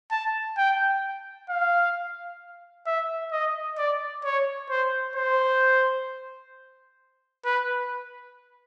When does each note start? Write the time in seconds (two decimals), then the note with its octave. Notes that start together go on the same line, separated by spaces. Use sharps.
0.11 A5
0.57 G5
1.49 F5
2.87 E5
3.32 D#5
3.78 D5
4.24 C#5
4.70 C5
5.16 C5
7.45 B4